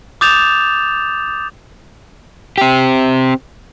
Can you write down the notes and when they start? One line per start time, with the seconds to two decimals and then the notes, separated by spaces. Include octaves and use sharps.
0.21 D6 D#6 G6 A6 E7 F7
2.58 C4 G4